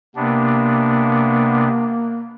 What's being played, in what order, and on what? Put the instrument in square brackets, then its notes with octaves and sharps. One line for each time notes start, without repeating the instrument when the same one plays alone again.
[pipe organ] C3 B3 D4 [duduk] A#3